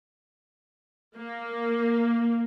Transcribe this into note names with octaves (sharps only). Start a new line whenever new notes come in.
A#3